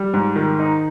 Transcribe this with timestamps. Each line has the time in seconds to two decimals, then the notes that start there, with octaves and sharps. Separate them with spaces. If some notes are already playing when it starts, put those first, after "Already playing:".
Already playing: G3
0.14 G#2
0.36 D#3
0.59 D#4